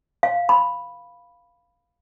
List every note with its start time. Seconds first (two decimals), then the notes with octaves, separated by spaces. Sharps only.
0.23 F5
0.49 B5